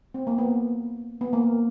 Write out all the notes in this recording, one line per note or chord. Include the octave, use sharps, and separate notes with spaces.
C4
A#3
B3
B3
A#3